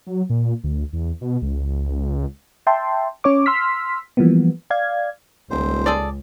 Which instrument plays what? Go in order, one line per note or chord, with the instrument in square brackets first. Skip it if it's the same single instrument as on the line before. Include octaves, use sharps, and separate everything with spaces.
[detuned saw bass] F#3
A#2
D2
E2
B2
C#2
[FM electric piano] E5 G5 A5 C6
C#4 C#5 D6
C6 E6 F6 B6
E3 F3 G3 A#3 B3
D5 F5 G#6
[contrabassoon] D#1 [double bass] C#2 [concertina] C5
[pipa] G#4 A4 D5